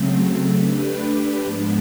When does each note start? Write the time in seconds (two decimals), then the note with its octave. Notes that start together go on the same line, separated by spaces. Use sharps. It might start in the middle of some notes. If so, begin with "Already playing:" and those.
Already playing: C#3 F#3 A3 C4
0.51 A3 D4 G4 B4
1.40 G#2 F3 G#3 B3 D4